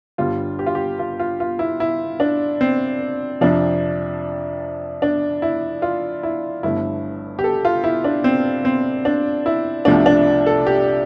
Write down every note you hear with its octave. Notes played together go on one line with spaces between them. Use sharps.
G1 G2 D3 G3 F4
G4
F4
G4
F4
F4
F4
E4
E4
D4
C4
F2 C3 F3 D4
D4
E4
F4
E4
G1 G2 D3 A3 E4
G4
A4
F4
E4
D4
C4
C4
D4
E4
C2 C3 F3 A3 D4
D4
A4
G4